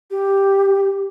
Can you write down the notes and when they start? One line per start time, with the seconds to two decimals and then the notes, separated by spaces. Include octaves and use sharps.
0.11 G4